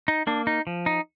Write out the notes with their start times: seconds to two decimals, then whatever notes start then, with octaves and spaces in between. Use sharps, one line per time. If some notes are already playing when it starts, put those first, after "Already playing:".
0.08 D#4
0.27 A#3 D4
0.47 D#4
0.67 F3
0.86 D#4